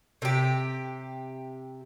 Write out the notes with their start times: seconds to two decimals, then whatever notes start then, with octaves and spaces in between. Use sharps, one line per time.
0.22 C3 G4